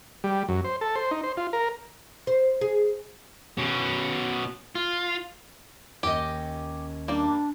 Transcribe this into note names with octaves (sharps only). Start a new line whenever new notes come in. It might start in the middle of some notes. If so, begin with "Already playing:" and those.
G3
F#2
C5
A4
C5
D#4
C5
F4
A#4
C5
G#4
B2 C#4
F4
D#2 C#4 G4 D#5
G3 A#3 D4